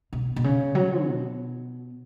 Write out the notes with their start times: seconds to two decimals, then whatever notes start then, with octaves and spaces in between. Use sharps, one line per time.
0.13 B2
0.36 B2
0.44 C#3
0.75 F#3
1.06 B2